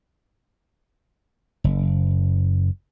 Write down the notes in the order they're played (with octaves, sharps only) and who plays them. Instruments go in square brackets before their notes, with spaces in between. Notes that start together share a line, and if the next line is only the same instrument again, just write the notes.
[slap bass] F#1